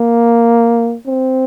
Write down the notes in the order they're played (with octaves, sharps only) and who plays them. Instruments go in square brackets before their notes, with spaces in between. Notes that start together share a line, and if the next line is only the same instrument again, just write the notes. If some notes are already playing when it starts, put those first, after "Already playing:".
Already playing: [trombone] A#3
C4